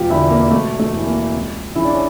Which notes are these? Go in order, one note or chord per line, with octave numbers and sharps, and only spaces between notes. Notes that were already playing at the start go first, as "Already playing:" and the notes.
Already playing: E1 F4 G4
E2 D3 E4
A#3
E1 A3
A3
E2 E3
A#3
C#2
C#3 E3 E4
D4
C#4